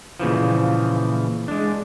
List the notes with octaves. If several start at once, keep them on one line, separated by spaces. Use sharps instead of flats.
A#2 C#3 E3 F3
G#3 D4